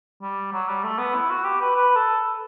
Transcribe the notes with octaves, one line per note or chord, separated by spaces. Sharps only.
G3
F#3
G3
A3
B3
E4
F#4
G4
B4
B4
A4